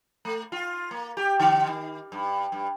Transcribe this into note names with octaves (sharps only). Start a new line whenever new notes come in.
A3
F4
A#3
G4
D3
D#3
G2
G2